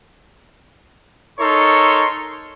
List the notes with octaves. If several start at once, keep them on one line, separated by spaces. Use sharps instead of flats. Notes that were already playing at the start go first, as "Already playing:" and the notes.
D#4 A4 A#4 C#5 C6 C#6